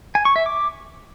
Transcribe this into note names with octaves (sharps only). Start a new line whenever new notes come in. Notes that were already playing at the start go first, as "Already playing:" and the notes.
G#5
C#6
E5
D6